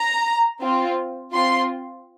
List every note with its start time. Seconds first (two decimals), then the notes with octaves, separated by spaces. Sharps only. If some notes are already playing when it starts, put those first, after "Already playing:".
Already playing: A#5
0.62 C4 F4
1.33 C4 F4 C6